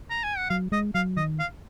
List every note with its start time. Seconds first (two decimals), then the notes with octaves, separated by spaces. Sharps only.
0.10 A#5
0.24 G#5
0.37 F#5
0.50 F#3 F5
0.72 G#3 D#5
0.94 F#3 F5
1.17 D#3 D#5
1.39 F5